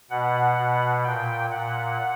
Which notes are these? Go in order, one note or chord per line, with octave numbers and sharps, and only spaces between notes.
B2 F#5
B2
A#2 G5
A#2 F#5